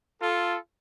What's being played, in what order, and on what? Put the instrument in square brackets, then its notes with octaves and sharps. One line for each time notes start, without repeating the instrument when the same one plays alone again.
[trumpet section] F4 A4